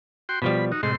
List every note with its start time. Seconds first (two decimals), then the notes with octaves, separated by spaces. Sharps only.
0.29 F#4 G5 C6
0.42 B2 F3 G3 B5
0.72 D#4 F#4
0.83 A2 C3 G#3 C6